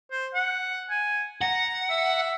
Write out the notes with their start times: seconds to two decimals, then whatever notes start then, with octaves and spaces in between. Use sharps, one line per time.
0.11 C5
0.34 F#5
0.90 G#5
1.42 F#5 A#5
1.90 E5